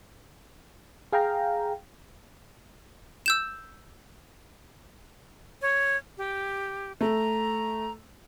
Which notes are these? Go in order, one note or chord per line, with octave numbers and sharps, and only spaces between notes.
G#4 F5 G5 A#5
E6 G6 E7
C#5
G4
A3 A#5